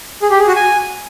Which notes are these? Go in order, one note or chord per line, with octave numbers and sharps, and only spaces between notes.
G#4
G4
G#4
F#4
G#5